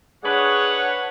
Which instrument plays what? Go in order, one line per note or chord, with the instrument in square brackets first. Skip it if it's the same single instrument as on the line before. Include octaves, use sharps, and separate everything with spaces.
[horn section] D4 B4 C#5 [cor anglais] G#4 [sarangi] F#5